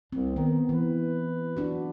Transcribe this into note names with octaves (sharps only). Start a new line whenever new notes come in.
C2 C4
D#3 B3
E3 B4
D4 F#4